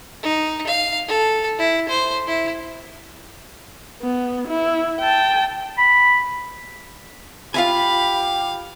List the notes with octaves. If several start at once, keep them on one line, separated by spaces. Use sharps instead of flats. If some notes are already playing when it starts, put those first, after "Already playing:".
D#4
F5
A4
E4
C5
E4
B3
E4
G5 A5
B5
F4 G4 E5 F5 G#5 B5